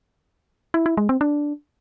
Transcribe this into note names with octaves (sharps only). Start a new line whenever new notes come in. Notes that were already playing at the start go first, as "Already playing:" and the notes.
E4
E4
G#3
C4
D4